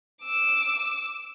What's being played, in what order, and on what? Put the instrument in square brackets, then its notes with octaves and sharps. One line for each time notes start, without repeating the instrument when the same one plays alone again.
[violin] D6 E6